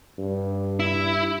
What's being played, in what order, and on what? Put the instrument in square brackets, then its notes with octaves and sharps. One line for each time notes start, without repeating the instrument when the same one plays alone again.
[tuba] G2
[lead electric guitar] E4